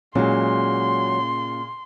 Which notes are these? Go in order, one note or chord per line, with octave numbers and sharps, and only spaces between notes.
A#2 C#3 F#3 G#3 C6